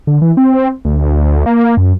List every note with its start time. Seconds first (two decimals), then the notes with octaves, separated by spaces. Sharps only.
0.07 D3
0.22 E3
0.37 C4
0.85 D2
1.46 A#3
1.77 F#2